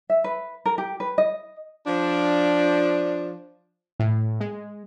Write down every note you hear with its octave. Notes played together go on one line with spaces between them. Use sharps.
E5
B4
A#4
G4
B4
D#5
F3 D4
A2
G#3